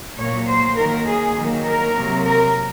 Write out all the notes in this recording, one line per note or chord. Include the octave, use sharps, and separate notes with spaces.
A#2 F#3 A#3 C#5
C5
D#3 F#3 A#3 A#4
G#4
D#3 F#3 A#3
A#4
C3 F#3 A#3
A#4